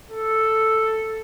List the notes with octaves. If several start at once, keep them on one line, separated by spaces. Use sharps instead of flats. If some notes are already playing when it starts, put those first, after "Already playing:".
A4